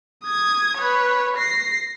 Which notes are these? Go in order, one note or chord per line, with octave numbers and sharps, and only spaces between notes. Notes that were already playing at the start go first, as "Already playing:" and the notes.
D#6 G#6
B4 C#5
A#6 C7